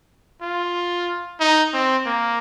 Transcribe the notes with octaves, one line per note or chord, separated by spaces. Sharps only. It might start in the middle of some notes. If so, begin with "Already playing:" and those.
F4
D#4
C4
A#3